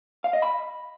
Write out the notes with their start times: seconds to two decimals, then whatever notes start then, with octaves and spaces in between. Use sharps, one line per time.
0.24 F5
0.33 D#5
0.42 B5